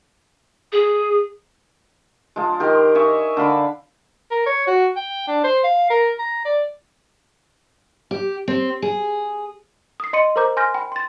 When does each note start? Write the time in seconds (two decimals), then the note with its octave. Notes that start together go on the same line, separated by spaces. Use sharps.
0.72 G#4
2.36 F3 G#3
2.60 D#3 G4 A#4 C6
2.95 C#5 D#5 E5 G#5
3.37 D3 F5 B5 D6
4.31 A#4
4.46 C#5
4.67 F#4
4.96 G5
5.28 D4
5.44 C5
5.64 F5
5.90 A#4
6.19 A#5
6.45 D5
8.11 G4
8.48 C4
8.82 G#4
10.00 D#6 C7
10.13 D#5 C6 C#7 D#7
10.36 A#4 C5 A#5 D6 G6
10.57 G#5 C6 F6 G6 A#6
10.74 G5 B5
10.92 C6 A6